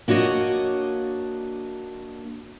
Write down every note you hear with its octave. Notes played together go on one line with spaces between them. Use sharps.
A#3 D4 F#4 C#5 D#5